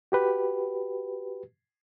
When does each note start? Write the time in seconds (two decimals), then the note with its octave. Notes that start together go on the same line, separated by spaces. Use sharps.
0.12 F#4 G4 B4